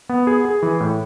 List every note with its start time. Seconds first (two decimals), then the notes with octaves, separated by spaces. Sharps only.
0.09 B3
0.27 G#4
0.45 G#4
0.62 E3
0.80 A2